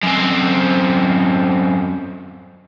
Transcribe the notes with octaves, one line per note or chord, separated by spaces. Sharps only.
F#2 C4